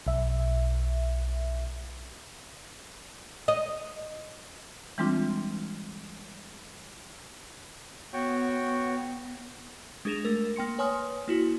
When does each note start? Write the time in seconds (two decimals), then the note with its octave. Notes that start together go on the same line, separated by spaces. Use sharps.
0.07 B1 E5
3.48 D#5
4.98 E3 G3 G#3 C4 D4 F4
8.13 B3 F#4 C#5 G5
10.05 G#3 D4 G#4 A#6 E7 F7
10.25 A3 A#4
10.56 A#3 G5 C6 C#7
10.79 B4 C#5 G#5 C6 D#6 F6
11.28 A#3 E4 F#4